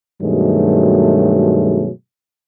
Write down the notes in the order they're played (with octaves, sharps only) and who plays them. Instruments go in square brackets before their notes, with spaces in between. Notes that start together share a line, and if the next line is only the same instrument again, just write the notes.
[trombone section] G2 B2 D#3 F#3 G#3 A3